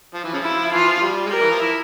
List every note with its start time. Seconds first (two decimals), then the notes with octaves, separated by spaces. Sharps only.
0.14 F3
0.24 E3
0.33 C#3 F3
0.43 E4
0.72 E3 F4
0.88 F3
1.01 G3
1.26 G#3
1.30 G3 A#4
1.41 E3
1.51 F3
1.60 E4